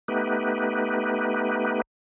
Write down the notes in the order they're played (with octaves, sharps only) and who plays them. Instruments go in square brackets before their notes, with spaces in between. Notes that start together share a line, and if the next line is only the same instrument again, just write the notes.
[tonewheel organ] A3 B3 D#4 G4 B4